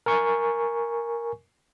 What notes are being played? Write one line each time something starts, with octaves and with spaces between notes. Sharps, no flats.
A#4 G#5 C#6